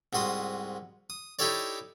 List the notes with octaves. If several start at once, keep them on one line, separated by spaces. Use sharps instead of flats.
C2 G#2 F#4 C6 D#6
D#6
D#4 E4 G4 A4 C#5 D5